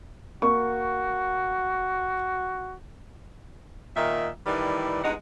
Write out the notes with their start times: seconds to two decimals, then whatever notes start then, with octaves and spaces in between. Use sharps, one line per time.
0.42 A#3 F#4 C#6
3.97 A#2 D#3 E5
4.47 A2 D#3 E3 G3 B4 D5
5.04 E2 G2 G#3 D#4 F#5